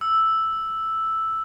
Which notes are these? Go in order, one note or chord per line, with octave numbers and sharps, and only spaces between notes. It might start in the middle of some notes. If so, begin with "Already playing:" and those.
E6